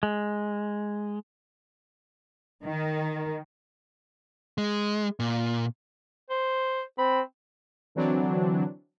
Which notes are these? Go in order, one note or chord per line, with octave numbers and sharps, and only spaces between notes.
G#3
D#3
G#3
A#2
C5
C4 B5
D3 E3 F#3 C4 D4